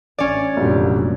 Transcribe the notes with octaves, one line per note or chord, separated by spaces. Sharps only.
A1 C#4 D5
F1 B1 F#2 A#2 D3 G3